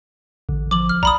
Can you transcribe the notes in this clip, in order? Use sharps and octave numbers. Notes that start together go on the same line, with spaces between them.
A1 D3
F3 D6 F#7
F6
B1 D5 A#5 B5 D#6